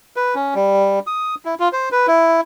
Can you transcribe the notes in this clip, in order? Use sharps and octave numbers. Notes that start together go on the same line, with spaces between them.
B4
C#4
G3
D#6
E4
F4
C5
B4
E4